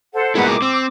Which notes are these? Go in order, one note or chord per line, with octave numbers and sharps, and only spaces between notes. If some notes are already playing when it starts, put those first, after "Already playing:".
A4 C5 F#5
A#1 B2 G#3 E4 A#4 B4 F#5
D6
C4 E6